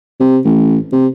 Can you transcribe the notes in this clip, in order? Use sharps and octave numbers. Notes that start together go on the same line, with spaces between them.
C3
A1
C3